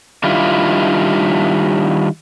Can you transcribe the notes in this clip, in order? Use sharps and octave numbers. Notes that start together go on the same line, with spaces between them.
D#3 G3 D4 E4 F4